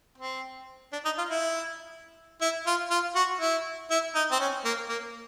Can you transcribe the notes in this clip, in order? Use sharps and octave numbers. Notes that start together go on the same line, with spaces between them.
C4
D4
D#4
F4
E4
E4
F4
F4
F#4
E4
E4
D#4
C4
C#4
A#3
A#3